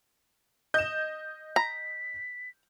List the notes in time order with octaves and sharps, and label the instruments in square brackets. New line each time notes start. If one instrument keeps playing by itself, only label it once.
[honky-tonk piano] D#5 E7 [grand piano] G6
[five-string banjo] A#5 [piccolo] B6